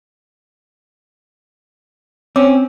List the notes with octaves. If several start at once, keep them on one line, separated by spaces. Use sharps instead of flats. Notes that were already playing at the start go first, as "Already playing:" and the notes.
C4 C#4 C#5 D6